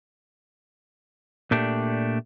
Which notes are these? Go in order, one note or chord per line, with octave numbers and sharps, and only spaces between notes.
A#2 A3 D4 G4